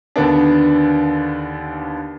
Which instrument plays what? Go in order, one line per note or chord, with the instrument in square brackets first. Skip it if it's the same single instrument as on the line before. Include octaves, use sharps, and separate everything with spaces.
[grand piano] D#2 D3 B3 D4